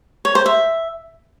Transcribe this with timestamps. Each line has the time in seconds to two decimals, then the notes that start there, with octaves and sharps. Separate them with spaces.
0.25 C#5
0.35 C5
0.46 E5